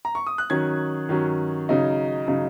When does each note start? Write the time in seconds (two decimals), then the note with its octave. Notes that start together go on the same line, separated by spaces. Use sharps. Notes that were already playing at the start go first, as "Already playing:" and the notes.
0.05 A#5
0.15 C#6
0.27 D#6
0.38 F#6
0.50 D#3 F#3 C#4 G#6
1.09 D#3 F#3 C#4
1.69 C#3 F#3 D#4
2.28 C#3 F#3 D#4